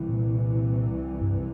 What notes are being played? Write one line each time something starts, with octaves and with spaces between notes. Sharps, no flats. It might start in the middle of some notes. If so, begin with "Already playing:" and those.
Already playing: C2 C3 E3
A#2
G2